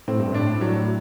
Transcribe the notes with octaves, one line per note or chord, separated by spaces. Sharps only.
A2 C4
G2
A2 D4
F#3